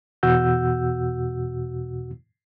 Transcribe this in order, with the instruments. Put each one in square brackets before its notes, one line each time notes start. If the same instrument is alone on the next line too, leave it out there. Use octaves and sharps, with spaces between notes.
[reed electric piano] E2 B2 F#4 F#5 E6 G6